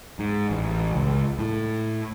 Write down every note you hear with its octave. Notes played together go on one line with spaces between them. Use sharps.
G#2
A1
C#2
A2